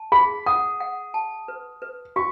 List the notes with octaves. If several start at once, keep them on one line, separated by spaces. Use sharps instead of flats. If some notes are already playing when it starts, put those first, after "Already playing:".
Already playing: A5
G#4 B5
F#5 D#6
F#5
A5
B4
B4
F#4 C#6